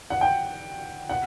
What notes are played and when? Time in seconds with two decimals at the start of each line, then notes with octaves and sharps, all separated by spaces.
0.10 F#5
0.21 G5
1.09 F#5